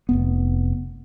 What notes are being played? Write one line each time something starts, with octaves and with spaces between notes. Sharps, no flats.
F1 E2 B3